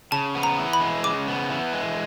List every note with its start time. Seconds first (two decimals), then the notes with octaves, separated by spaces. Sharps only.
0.12 C#3 A5
0.35 B3
0.43 A#5
0.58 E3
0.73 B5
0.80 G#3
1.04 C#3 D6
1.27 B3
1.50 E3
1.73 G#3